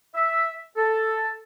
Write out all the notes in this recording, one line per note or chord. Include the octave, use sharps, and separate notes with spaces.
E5
A4